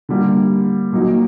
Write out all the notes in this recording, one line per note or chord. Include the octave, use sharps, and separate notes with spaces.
D3 G3 A#3
A#2 F#3 A#3 D#4